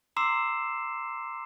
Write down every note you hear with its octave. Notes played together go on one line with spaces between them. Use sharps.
A#5 C6 D6 E6 C7 E7